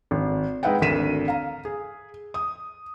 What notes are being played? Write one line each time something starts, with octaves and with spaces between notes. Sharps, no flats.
G#1
G#3 D#4 B4 E5 F#5 G5
G#1 D2 A#4 B6 D#7 E7
F5 A#5
G#4
D#6